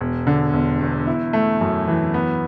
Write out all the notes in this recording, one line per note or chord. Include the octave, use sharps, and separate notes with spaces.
E1
D3
E1
E2
E4
A3
F#2
E3
B3